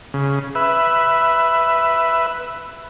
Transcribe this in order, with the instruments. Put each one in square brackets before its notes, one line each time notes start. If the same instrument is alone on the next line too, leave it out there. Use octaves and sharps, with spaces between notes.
[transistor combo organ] C#3
B4 E5